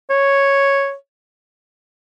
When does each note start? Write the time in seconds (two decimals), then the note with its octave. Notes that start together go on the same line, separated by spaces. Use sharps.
0.10 C#5